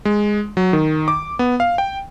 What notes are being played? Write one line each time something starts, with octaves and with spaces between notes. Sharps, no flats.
G#3
F#3
D#3
D6
B3
F5
G5